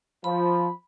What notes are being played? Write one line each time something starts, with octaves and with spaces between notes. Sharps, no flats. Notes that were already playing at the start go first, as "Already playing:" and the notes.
F3 B5